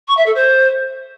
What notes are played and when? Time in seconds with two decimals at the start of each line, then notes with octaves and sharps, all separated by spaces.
0.08 C#6
0.17 E5
0.26 A4
0.35 C5